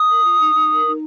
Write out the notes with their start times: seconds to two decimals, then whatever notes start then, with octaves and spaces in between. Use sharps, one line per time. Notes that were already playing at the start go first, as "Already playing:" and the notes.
Already playing: D#6
0.10 A#4
0.24 F4
0.40 D#4
0.54 D#4
0.70 A#4
0.85 D#4